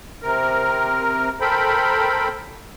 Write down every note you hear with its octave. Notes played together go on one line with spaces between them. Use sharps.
C3 A#4
A4 A#4 C5 G5 B5